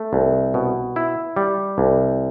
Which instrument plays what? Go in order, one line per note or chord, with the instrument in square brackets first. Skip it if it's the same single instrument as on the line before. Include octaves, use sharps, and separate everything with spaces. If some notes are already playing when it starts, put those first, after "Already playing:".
Already playing: [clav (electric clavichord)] A3
C2
B2
E4
G3
C2